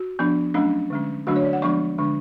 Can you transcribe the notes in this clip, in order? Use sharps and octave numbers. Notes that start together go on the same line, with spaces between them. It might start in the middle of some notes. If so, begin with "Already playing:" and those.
Already playing: F#4
F3 B3 D4
F#3 A3 C#4 D4
D3 G#3 C#4
D3 F#3 A3 D4 F#4
C#5
D5
F#5
F3 G#3 B3 D4 C#6
D3 G#3 D4